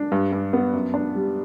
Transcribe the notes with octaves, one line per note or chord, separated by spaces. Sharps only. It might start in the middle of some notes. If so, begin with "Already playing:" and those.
Already playing: D4
G2
G2
B3
F#2
D4
G3